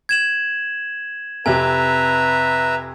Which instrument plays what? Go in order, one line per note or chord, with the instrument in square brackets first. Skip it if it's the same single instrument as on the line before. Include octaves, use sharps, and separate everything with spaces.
[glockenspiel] G#6 E7 F#7
[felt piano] F2 C3 [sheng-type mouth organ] B4 E5 A#5 [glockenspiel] G#5